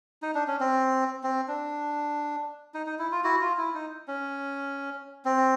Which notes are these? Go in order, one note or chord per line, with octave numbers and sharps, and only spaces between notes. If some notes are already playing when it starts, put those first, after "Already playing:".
D#4
D4
C#4
C4
C4
D4
D#4
D#4
E4
F4
E4 F#4
F4
E4
D#4
C#4
C4